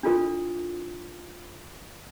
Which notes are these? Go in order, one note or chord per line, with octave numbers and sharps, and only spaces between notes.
D4 E4 F4 A4 A#4